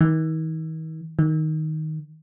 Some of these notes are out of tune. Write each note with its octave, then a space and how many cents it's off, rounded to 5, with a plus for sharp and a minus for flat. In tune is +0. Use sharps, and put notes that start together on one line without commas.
D#3 +40
D#3 +5